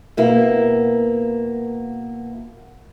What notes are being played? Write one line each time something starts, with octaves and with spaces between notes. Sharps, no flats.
B2 A#3 E4